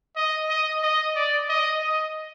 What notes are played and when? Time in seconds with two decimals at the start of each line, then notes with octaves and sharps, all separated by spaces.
0.16 D#5
0.49 D#5
0.83 D#5
1.15 D5
1.49 D#5
1.82 D#5